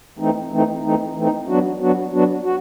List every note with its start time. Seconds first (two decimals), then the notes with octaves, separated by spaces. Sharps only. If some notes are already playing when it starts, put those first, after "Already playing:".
0.19 E3 A3 C4 D#4
0.51 E3 A3 C4 D#4
0.83 E3 A3 C4 D#4
1.16 E3 A3 C4 D#4
1.48 F#3 B3 D4 F#4
1.80 F#3 B3 D4 F#4
2.12 F#3 B3 D4 F#4
2.44 F#4